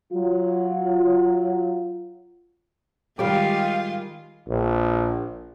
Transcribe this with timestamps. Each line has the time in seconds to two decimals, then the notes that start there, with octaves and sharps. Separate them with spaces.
0.13 F#3 F4
3.19 D#3 G3 G#3 F4 G4 D5 F5
4.48 A#1